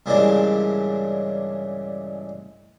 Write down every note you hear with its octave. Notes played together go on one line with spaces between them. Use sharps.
G2 A#2 C#3 E3 G#3 D4